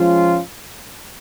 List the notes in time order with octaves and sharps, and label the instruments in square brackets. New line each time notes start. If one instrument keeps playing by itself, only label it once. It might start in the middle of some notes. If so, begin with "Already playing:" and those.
Already playing: [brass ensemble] F3 G#3 C#4 F4